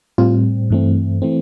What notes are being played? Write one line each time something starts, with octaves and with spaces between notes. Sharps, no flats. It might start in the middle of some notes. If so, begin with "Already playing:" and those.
A2 G3 C4 F4
G2 E3 A3 C4
E3 A3 C4